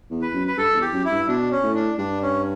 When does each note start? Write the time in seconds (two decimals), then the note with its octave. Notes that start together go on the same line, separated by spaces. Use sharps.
0.11 E2
0.22 B4
0.34 F#2
0.47 B4
0.57 G2 A4
0.74 E2
0.81 G4
0.93 F#2
1.05 E4
1.10 G2
1.27 B2 D4
1.51 C#4
1.63 A2
1.75 D4
1.98 G2 D4
2.22 C#4